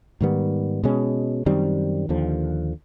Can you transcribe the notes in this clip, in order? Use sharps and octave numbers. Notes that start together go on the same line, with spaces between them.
G#2 D#3 G3 B3
B2 G#3 C#4
F#2 D#3 G3 C4
D#2 D3 F3